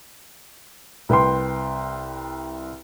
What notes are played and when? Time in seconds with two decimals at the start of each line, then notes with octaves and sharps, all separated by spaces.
1.09 C2 B4 G5 C6